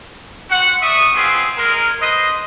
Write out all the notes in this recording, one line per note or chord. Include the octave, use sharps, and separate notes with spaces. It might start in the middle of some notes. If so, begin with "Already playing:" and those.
C4 F#4 F#5
D5 E5 C#6 D#6
B3 C4 F4 G#4 E5
G#3 A#4
B4 C5 D#5